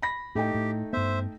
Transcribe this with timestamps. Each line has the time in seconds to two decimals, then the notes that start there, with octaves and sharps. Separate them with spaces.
0.02 B5 A#6
0.35 A2 A3 D#4 G4 G5
0.55 A2
0.93 G2 B3 C5 E5